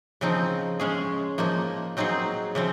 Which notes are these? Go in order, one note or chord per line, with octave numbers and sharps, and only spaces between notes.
C#3 F3 C4 D#4
G#3 C#4 G#4
F3 A#3 D#4
F#3 C4 D#4 G#4
C#3 F3 C4